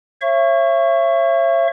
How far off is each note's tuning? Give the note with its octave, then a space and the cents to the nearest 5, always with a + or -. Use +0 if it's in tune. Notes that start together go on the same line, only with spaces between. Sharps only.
C#5 -40 E5 +35 C#6 +0